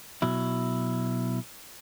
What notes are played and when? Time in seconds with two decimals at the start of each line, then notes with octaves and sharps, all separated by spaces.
0.22 B2 F#3 E4